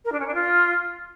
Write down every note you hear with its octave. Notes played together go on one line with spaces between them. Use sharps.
A#4
D4
C#4
D4
F4